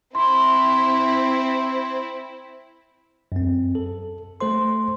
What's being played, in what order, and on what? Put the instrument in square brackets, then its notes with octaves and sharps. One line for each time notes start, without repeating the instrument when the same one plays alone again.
[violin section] C4 E4 [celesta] C6
[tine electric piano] F#2 C4
A4
A3 A4 C5 C6